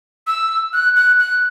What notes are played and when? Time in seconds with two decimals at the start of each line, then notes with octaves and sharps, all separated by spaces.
0.27 E6
0.73 F#6
0.96 F#6
1.19 F#6